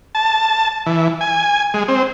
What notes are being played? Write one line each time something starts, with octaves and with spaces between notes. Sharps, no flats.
A5
E3
G#5
G#3
C4